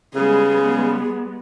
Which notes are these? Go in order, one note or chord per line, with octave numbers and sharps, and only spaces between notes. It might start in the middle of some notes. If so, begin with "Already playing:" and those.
C#3 G3 G#3 B3 G#4